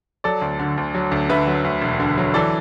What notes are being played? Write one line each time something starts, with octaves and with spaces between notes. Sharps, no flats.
F#3 A4 D5
D2
D3
D2
F#3
D2
D3 B4 E5
F#3
D2
E1
D3
F#3
E3 A4 D5